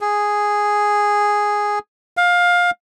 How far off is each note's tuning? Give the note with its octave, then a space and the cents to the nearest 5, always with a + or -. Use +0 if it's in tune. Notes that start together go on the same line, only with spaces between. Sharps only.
G#4 -5
F5 +20